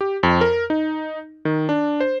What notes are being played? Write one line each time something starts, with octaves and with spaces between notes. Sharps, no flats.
G4
F2
A#4
D#4
D#3
D4
C5